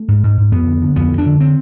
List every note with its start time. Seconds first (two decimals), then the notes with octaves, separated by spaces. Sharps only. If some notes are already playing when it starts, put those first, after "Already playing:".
Already playing: A3
0.08 G#2
0.23 G#2
0.37 G#2
0.52 F2 B3
0.67 D3
0.82 D3
0.96 F2 B3
1.11 F2
1.18 D4
1.26 D3
1.40 C4